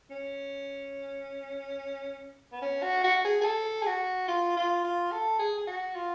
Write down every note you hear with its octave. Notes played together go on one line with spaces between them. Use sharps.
C#4
B3
C#4
F#4
F#4
G#4
G#4
A4
G#4
F#4
F4
F4
F4
A4
G#4
G#4
F#4
F4